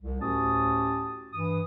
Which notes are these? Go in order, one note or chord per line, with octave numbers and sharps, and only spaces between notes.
C2
D2 A2 C#4 G4 A5 D#6
G2 E3 D#6